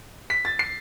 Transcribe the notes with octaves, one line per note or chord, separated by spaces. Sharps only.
B6
A6
C7